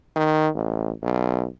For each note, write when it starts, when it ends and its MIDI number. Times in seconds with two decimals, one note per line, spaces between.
0.16 0.48 51
0.55 0.91 33
1.03 1.45 35